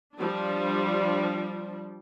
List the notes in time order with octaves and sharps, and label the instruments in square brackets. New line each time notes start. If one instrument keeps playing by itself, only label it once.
[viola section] F3 G3 D4